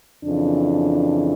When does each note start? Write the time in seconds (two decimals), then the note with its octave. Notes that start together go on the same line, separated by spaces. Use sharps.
0.23 F2 C#3 E3 D4